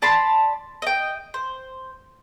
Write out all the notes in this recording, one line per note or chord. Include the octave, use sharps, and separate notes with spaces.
D5 A5 B5 C6
D#5 G5
C5